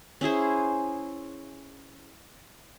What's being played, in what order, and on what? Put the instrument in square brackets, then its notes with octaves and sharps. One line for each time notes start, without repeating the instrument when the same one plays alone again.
[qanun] C#4 E4 G#4 C5